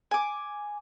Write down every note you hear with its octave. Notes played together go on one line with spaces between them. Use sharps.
G#5 D6